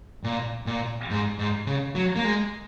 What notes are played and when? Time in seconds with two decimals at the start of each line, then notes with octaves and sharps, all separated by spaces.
0.24 A#2
0.66 A#2
1.10 G#2
1.39 G#2
1.66 C#3
1.95 F#3
2.16 A#3
2.25 G#3